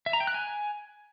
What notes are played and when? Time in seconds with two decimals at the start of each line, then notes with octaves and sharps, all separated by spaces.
0.06 E5
0.13 A#5
0.20 G5
0.27 F#6
0.34 G#5